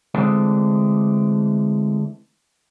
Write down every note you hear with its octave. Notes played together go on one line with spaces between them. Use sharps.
D3 E3 G#3 A3 C4 D4